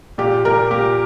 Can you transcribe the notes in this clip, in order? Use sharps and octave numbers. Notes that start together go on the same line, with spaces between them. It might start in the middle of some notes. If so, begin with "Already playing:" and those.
A#2 G4
A#2 A#4
A#2 G4